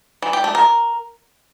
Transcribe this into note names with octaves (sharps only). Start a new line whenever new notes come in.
E3
G4
A3
A#4